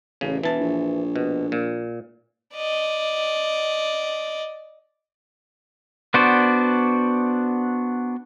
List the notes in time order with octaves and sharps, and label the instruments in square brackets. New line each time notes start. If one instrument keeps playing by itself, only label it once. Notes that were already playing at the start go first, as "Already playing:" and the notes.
[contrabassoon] A1 [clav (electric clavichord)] C#3
[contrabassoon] E1 [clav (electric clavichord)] E3 A5
[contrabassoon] A#1
[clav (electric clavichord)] B2
A#2
[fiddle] D5 D#5
[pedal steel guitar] B3 D4 F#4 C5 D5